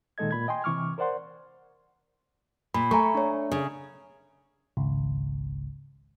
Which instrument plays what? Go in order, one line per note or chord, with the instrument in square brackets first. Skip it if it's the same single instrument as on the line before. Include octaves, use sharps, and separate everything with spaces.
[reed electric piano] A#2 D#3 G#3 A4 D#5 G#6
A#2 B5 G#6
D#5 G5 G#5 C6
C3 E3 C#6 D6 F6
A#4 C5 D5 F#5 C6
[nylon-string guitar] A#2 [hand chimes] B5
[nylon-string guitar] A3 [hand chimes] G#5 A#5 C#6
[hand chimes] D4 C#5
[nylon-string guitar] C#3
[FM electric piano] G#1 C#2